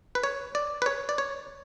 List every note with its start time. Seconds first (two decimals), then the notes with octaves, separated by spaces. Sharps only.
0.15 B4
0.23 C#5
0.55 D5
0.82 B4
0.86 C#5
1.09 D5
1.18 C#5